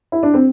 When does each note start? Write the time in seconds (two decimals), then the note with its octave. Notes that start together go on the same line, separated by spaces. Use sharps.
0.12 E4
0.23 D4
0.34 C4